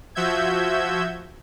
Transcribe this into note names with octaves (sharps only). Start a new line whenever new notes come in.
F3 F#4 E5 E6 G6 G#6